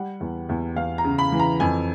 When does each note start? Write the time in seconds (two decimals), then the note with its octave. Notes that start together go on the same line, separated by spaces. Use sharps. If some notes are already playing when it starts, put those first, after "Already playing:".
Already playing: G3 F#5
0.20 E2
0.49 E2
0.76 E2 F5
0.98 A#5
1.04 C#3
1.18 B5
1.32 E3
1.39 A#5
1.60 F2 G#5